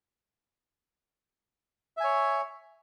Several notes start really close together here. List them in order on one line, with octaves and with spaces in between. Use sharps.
E5 G#5 C#5